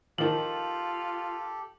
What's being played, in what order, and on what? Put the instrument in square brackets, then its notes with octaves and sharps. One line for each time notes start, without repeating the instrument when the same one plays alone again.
[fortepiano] D#3 F3 [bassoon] F4 [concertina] G4 A4 [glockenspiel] F#7